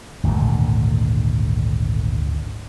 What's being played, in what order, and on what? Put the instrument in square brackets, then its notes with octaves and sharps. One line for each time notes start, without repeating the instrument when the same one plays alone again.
[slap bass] G#1 D2 A#2 D3